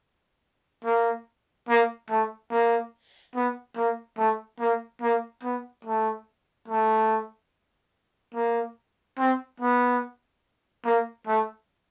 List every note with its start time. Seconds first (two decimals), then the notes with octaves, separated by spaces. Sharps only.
0.84 A#3
1.69 A#3
2.10 A3
2.51 A#3
3.35 B3
3.76 A#3
4.18 A3
4.59 A#3
5.02 A#3
5.43 B3
5.85 A3
6.68 A3
8.35 A#3
9.18 C4
9.60 B3
10.85 A#3
11.27 A3